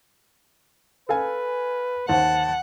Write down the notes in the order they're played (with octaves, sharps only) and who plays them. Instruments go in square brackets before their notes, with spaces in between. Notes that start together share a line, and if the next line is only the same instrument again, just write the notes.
[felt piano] A4 F5 G#5 [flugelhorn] B4
[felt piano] D#2 C5 [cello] F#5 [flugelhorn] A5